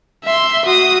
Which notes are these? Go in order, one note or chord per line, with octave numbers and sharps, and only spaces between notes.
E5 C6
F#4 D#6